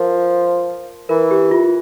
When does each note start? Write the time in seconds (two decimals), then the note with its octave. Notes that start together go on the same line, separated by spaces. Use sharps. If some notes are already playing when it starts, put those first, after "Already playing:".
Already playing: F3 A#4
1.09 E3 A#4
1.31 G4
1.51 F4